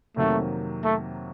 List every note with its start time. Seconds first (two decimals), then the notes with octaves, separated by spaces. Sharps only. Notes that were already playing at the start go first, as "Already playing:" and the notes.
0.16 F2 C3 D#3 F#3 A3 A#3
0.84 A3